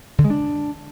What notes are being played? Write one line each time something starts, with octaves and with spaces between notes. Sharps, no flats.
D3
G#3
D4